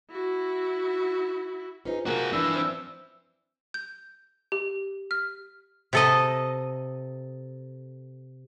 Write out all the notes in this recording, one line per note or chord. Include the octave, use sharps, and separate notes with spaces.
E4 F#4
C#4 D#4 F4 G#4 B4 C5
G#2 C3 A#3 F#4 G#4 A#4 A#5
E3 F3 D4 E4 B4 E6
C4 C5
G6
G4
F6
C3 A4 D#5